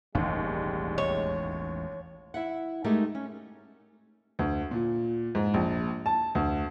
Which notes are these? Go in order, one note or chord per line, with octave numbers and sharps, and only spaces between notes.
E1 A1 D#2 G3 G#3
C#5
E4 E5 F#5
G#3 A3 D#4 G4 G#4 A#4
C#4
D2
A#2
G#2
A#1
A5
D2